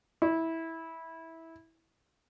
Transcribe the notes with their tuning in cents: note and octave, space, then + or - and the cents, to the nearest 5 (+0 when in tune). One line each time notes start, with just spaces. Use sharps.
E4 -15